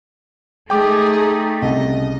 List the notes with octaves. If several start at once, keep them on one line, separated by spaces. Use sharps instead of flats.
A3 D#4 G#4 G5 D6
C2 C#3 D#5